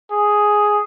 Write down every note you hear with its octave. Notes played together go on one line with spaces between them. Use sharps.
G#4